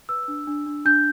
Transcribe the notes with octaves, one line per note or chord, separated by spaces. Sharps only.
B4 E6
D4
D4
D4
D4 G6